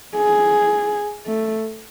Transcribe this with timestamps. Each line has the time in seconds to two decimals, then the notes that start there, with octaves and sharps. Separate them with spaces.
0.16 G#4
1.27 A3